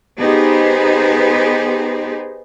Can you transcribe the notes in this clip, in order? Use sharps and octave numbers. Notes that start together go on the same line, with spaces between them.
B3 D#4 G4 G#4 C5